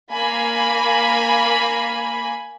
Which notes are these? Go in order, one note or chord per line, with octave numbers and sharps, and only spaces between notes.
A#3 G#5 B5